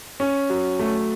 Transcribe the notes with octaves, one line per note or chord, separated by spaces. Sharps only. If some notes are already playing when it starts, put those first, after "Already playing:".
C#4
F#3
A3